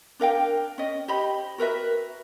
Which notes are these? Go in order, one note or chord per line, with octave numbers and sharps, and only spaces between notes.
D4 A#4 F5 G5
C#4 D#5
G4 C5 D#5 B5
F#4 A#4 B4 E5